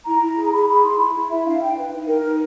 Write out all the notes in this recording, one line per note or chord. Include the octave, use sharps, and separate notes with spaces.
E4 A#5
E4
G#4
G#4 B5
G#4 B5
E4 C6
E4 B5
E4
E4 E5
D4 F5
D4 G5
B4
D#4
A#4
D#4